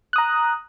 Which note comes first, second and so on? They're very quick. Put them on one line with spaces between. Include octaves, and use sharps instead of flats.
F#6 D#6 A#5